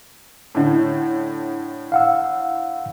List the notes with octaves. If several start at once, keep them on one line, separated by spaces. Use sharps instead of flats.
A2 D3
F5 F#5 E6